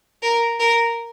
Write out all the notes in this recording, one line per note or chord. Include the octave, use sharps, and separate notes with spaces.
A#4
A#4